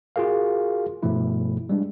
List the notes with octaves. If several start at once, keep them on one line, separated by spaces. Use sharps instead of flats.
F4 F#4 G#4 A#4 F5
G2 B2 F3 A3 E4
G3 G#3 D4